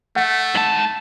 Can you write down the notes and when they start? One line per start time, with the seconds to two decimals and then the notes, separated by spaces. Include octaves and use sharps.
0.16 A3 F#5
0.55 G#2 A5